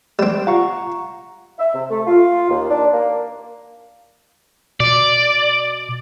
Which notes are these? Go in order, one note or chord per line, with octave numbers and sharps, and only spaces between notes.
G3 C4 E7
F4 F#5 A#5 C#6
E5
C3
A3
F4
D#2
D4
A#3
B2 D5